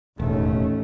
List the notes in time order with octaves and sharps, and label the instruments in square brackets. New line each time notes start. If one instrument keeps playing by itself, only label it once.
[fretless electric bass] E1 [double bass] A1 [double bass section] D#2 A3 C#4